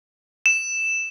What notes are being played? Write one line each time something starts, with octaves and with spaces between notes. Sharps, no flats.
E7